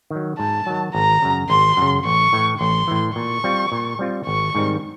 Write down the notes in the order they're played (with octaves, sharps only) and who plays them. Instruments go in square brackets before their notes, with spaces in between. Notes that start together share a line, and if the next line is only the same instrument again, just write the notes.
[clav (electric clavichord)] D#3 F#3
[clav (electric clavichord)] G#2 [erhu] A5
[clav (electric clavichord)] D#3 F#3
[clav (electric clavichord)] G#1 [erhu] A#5
[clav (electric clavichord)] F#2 C#3
[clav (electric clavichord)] G#1 [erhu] C6
[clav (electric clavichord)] F#2 C#3
[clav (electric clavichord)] A1 [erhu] C#6
[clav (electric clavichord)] A2 E3
[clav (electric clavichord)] A1 [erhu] C6
[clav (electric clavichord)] A2 E3
[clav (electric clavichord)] A#2 [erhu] C#6
[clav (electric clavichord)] G3 C4 F4
A#2
G3 C4 F4
[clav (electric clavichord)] G#1 [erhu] C#6
[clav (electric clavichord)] G#2 D#3 G3 C4